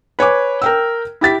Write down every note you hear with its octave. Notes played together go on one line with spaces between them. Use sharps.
B4 C#5 G#5 D6
A#4 G5 E6
E4 G4 A6 B6